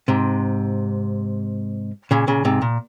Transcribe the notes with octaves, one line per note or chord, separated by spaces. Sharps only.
G#2 C3
A#2 C#3
A#2 C#3
G#2 C3
A#2